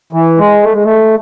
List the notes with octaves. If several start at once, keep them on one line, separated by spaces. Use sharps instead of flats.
E3
G#3
A3
G#3
A3